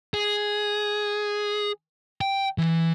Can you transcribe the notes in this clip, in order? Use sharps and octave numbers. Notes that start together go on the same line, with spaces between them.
G#4
G5
E3